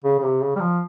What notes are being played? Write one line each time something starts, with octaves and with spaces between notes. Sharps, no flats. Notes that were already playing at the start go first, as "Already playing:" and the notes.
C#3
C#3
C3
C#3
G3
F3